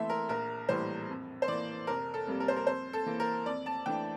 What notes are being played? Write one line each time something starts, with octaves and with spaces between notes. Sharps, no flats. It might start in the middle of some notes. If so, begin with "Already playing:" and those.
Already playing: E3 A3 E5 C6
A#4
A#1 A#4
A2 E3 G3 C5
F2
C5
E3 A#3 D5
F1 A#4
A4
F2 C3 G3 A#3
A#4
C5
A#4
F2 C5
A4
E3 A#3
A#4
F2 D5
A5
E3 A3 D4 G5